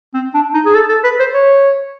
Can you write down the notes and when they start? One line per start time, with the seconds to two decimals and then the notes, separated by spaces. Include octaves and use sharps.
0.14 C4
0.34 D4
0.54 D#4
0.66 G#4
0.74 A4
0.89 A4
1.04 B4
1.20 C5
1.34 C#5